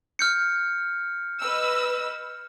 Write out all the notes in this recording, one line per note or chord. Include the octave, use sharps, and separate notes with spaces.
F6 G6 C#7
B4 D#5 E6